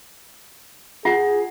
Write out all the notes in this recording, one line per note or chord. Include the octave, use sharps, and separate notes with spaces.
F4 G#4 F#5